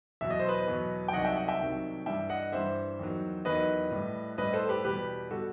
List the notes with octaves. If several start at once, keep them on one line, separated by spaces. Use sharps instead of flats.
E2 B2 F#3 E5
D#5
C5
B4 D#5
E2 B2 F#3
G5
C2 C3 D#3 F#3 D#5 F#5
E5 G5
D#5 F#5
E5 G5
C2 C3 D#3 F#3
G2 E3 G3 E5 G5
D#5 F#5
G2 E3 G3 C5 E5
E2 D#3 F#3
E2 D#3 F#3 B4 D#5
A2 G3
A2 G3 B4 D#5
A4 C5
G4 B4
E2 B2 G3 G4 B4
B2 G3 F#4 A4